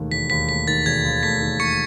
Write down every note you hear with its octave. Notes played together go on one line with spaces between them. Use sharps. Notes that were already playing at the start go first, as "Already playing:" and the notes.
Already playing: E1 D#2 D#3 A3
E1 B6
D#2 B6
A3 B6
D#3 A6
E1 G#6
D#2
A3 B6
D#3
E1 C#6 C#7